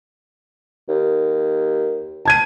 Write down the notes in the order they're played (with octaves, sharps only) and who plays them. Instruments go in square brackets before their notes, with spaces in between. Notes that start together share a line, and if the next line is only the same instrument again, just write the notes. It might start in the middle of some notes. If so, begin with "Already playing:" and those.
[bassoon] D#2
[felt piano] A5 G#6 D#7